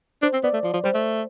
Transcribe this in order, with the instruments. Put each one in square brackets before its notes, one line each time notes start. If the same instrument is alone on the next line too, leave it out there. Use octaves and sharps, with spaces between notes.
[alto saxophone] D4 [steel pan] C5
[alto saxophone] C4
[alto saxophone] B3 [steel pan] D5
[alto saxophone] A3
[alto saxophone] F3 [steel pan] D5
[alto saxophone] F3
[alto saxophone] G3 [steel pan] C5
[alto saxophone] A3